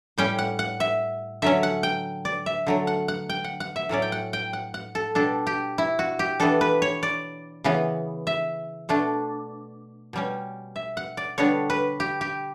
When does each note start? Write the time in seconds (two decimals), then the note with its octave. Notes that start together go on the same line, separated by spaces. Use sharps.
0.18 A2 G3 C#4 G5
0.39 F#5
0.59 F#5
0.80 E5
1.42 D3 F#3 C#4 E5
1.63 F#5
1.83 G5
2.25 D5
2.46 E5
2.67 D3 F#3 A3
2.87 F#5
3.08 F#5
3.29 G5
3.44 F#5
3.60 F#5
3.76 E5
3.89 A2 F#3 C#4 D5
4.02 G5
4.12 F#5
4.33 G5
4.53 F#5
4.74 F#5
4.95 A4
5.15 B2 G3 D4 A4
5.47 G4
5.78 E4
5.99 F#4
6.19 G4
6.40 E3 B3 D4 A4
6.61 B4
6.82 C#5
7.03 D5
7.64 C#3 E3 B3
8.27 E5
8.89 B2 A3 D4
10.13 B2 G3 C#4
10.76 E5
10.97 F#5
11.17 D5
11.38 D3 G3 B3 D4 C#5
11.70 B4
12.00 G4
12.21 G4